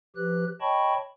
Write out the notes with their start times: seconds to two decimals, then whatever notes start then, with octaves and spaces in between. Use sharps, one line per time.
0.16 F3 G4 B4 F#6
0.61 C#5 D#5 G5 A5 B5 C#6